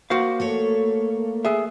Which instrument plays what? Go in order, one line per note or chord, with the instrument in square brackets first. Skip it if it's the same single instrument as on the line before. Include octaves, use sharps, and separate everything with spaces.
[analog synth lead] A#3 [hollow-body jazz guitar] F#4 C5 F5 [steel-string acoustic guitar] D5
[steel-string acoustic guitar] A3 A4 C#5
[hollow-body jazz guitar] G#4 E5